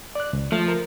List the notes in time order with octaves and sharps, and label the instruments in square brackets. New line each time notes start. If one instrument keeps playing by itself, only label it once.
[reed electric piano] D5 F#6
C#2
[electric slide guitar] F3 [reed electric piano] A3
[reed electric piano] A#4